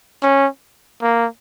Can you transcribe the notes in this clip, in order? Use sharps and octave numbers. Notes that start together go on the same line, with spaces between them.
C#4
A#3